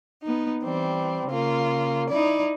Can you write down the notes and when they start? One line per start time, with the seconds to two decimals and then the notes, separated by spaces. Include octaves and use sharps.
0.23 B3 D#4
0.63 E3 G3 C4
1.27 C#3 A#3 F4
2.10 D#4 E4 D5